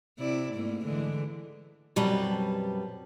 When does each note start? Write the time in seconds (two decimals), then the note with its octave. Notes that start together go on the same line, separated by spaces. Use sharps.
0.19 C3 E4 D5
0.54 G#2 A3 A#3
0.85 D3 E3 G#3
1.96 F#2 B2 G3 C4 B4 A5